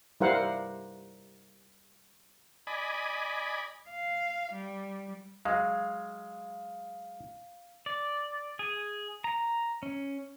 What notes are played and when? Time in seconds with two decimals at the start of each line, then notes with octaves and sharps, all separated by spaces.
0.21 G3 E4 A#4 C5 F5 F#5
2.67 D5 D#5 G#5 B5
3.89 F5
4.52 G3
5.45 F#3 G#3 F5
7.86 D5
8.59 G#4
9.24 A#5
9.83 C#4